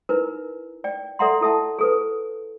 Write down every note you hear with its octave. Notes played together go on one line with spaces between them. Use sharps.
D#4 E4 A#4 B4
D5 G5
A4 D5 E5 F#5 A#5 C6
E4 A4 E5 A5
G#4 A4 B4